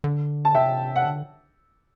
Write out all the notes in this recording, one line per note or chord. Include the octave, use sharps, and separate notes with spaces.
D3
A5
C3 E5 G5
F#5
D3